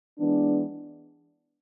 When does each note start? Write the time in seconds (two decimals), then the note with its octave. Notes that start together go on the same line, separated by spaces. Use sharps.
0.19 E3 G#3 B3 D4